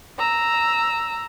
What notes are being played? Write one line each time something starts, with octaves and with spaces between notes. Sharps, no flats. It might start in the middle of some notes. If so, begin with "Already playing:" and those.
A#5 E6